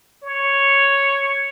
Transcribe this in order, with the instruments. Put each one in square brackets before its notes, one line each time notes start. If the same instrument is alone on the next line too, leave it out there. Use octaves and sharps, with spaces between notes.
[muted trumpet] C#5